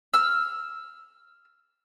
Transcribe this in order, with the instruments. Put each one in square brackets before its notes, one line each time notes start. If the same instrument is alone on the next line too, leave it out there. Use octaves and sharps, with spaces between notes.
[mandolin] E6 F6